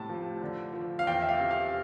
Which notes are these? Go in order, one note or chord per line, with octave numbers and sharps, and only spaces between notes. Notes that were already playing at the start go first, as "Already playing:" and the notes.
Already playing: A2 C3 A5
F3
D3
F3
F5
E2 G5
E5
F5
C3
F5